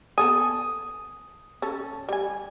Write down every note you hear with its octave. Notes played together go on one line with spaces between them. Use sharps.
B3 A4 G#5 D#6
C#4 A4
G3 G#5